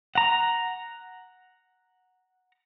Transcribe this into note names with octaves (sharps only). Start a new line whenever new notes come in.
F#5 A#5